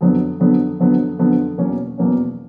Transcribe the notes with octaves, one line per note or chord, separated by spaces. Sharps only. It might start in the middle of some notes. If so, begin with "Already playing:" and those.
F2 D3 F#3 B3
F2 D3 F#3 B3
F2 D3 F#3 B3
F2 D3 F#3 B3
E2 B2 F#3 A#3 C#4
E2 B2 F#3 A#3 C#4